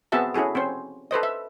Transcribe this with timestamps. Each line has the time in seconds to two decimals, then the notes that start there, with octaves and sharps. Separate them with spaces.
0.12 B3 C4 F#4 G#4 E5 A5
0.34 C#4 E4 F#4 G#4 A4
0.55 C4 C#4 C5
1.11 A4 B4 C5 D#5
1.23 E5